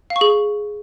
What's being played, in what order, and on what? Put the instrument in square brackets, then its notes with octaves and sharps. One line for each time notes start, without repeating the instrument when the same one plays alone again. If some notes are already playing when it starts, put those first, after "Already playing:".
[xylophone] F5
C#6
G#4